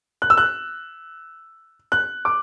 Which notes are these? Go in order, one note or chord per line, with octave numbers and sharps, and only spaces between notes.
F#6
E6
F#6
F#6
D6